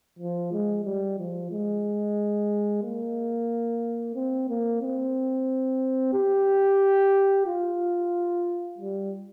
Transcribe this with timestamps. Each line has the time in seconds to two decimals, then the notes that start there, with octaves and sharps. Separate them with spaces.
0.19 F3
0.52 G#3
0.84 G3
1.18 F3
1.51 G#3
2.83 A#3
4.15 C4
4.49 A#3
4.82 C4
6.13 G4
7.46 F4
8.78 G3